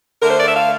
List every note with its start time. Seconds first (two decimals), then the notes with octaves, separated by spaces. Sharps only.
0.21 D3 A#4
0.25 A3 C5
0.38 D5
0.47 E5
0.55 F5